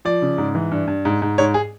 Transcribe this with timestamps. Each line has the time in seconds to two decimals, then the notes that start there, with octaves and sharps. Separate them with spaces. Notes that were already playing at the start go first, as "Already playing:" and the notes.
0.05 F3 D5
0.22 C#3
0.38 G#2
0.55 E3
0.71 G2
0.87 G2
1.05 G#2
1.22 G#2
1.38 G#2 C#5
1.54 G#4